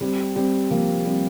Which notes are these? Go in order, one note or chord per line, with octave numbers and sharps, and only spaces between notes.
G3 C4
G3 C4
F3 A#3
G3 C4